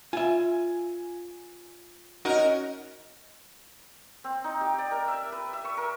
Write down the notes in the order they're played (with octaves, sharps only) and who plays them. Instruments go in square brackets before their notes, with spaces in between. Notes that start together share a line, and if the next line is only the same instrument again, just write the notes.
[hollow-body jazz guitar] F4 E5 [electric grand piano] G#5
[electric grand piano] C#4 F#4 [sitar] D#4 A#4
[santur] C4
D#4
G4
D5
A#4
E5
B4
E5
C#6
A#4